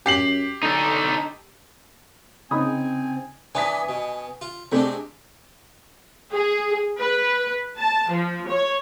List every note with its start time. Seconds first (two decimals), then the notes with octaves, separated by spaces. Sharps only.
0.06 F#2 G4 C7 F#7
0.63 D3 D#4 A4
2.51 C#3 C4 D#4 G#5 B5 D#6
3.55 E3 B3 D4 G#5 D#6 B6
3.89 B2
4.41 F4
4.72 C3 G#3 A3 C4 D4
6.32 G#4
6.97 B4
7.77 A5
8.09 F3
8.48 C#5